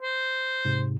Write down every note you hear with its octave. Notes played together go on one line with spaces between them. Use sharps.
C5
G#2 C3